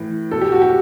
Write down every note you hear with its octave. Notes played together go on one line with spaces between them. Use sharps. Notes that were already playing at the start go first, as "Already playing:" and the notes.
Already playing: A2 E3
B2 A4
G4
F#4
G4